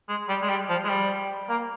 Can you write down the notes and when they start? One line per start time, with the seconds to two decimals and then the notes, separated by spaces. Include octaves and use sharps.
0.09 G#3
0.29 G3
0.41 G#3
0.49 G3
0.69 F3
0.84 G#3
0.89 G3
1.49 A#3